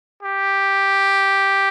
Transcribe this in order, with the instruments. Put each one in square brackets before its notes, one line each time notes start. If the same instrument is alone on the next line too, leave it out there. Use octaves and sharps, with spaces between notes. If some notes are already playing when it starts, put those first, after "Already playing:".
[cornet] G4